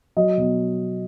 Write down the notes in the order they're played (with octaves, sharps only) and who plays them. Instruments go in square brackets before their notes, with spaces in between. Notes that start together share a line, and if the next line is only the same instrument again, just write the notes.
[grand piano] F#3 D#5
B2